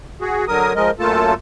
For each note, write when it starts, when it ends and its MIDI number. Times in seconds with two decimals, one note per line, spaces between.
0.21 0.45 66
0.21 0.45 68
0.48 0.73 50
0.48 0.73 54
0.48 0.73 70
0.48 0.73 87
0.75 0.91 53
0.75 0.91 56
0.75 0.91 70
0.75 0.91 75
1.00 1.34 42
1.00 1.34 57
1.00 1.34 58
1.00 1.34 65
1.00 1.34 69
1.00 1.34 81